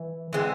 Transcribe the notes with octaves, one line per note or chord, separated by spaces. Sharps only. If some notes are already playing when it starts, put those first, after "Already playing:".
Already playing: E3
D3 E3 G#3 C4